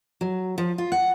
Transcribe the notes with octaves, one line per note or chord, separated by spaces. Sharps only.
F#3
F3
F4
F#5